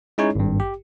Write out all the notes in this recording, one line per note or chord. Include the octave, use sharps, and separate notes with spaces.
G#3 C#4 D#4 E4 G#4 C#5
G#1 G2
G4